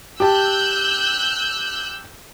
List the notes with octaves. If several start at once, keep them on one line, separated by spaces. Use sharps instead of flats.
G4 A5 E6 F#6 G6